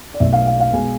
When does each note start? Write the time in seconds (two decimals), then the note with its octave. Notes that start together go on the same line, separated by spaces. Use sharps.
0.14 D5
0.20 B1 B2 A3 E5
0.33 F5
0.47 F5
0.60 F5
0.73 B2 G#3 G#5